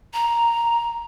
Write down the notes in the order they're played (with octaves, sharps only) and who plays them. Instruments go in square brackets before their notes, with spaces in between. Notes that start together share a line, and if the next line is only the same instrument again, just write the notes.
[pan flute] A#5